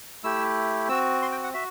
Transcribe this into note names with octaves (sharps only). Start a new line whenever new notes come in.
A3 E4 G4 E6
C4 F#4 E6
C6
G5
F#5
F#4 E5